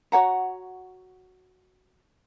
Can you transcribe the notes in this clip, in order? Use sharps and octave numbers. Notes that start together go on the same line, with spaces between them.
F#4 C#5 F#5 A#5